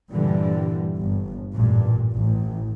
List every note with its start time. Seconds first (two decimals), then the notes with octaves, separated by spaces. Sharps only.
0.11 G2 A#2 D3 E3 G3
0.96 G1
1.54 A1 G2 A#2
2.13 A1 A2